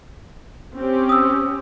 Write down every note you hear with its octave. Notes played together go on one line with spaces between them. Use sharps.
C4 C#4 G4
D#6 E6